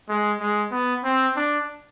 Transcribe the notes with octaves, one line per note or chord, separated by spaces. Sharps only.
G#3
G#3
B3
C4
D4